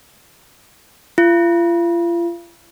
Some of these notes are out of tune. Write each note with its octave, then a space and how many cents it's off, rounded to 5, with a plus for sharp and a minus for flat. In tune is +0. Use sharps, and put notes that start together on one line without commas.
F4 -40